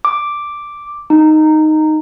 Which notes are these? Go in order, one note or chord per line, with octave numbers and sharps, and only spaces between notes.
D6
D#4